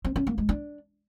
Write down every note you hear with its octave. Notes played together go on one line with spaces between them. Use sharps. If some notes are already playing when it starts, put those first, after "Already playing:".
C4
C#4
A#3
G#3
D4